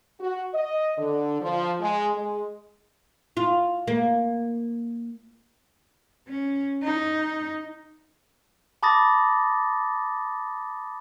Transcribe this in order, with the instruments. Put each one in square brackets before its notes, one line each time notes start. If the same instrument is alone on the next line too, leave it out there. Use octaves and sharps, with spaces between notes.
[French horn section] F#4
D#5
D3
F3
G#3
G#3
[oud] F4
A#3
[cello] C#4
D#4
[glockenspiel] A5 B5 D6 D#6 A6 A#6